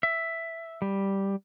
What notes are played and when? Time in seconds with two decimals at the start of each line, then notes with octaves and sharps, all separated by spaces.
0.03 E5
0.82 G3